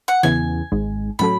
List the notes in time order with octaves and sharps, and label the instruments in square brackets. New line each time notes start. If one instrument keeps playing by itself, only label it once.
[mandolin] F#5
[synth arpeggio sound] E2 C#3 E3 B3 E4 [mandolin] G#5
[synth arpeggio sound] G#1 G#2 G#3
[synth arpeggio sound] A2 F#3 C#4 F#4 A4 [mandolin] B5